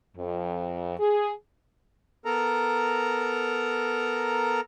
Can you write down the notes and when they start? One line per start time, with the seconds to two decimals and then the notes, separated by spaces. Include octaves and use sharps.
0.17 F2
1.00 G#4
2.25 B3 A4 A#4 A#5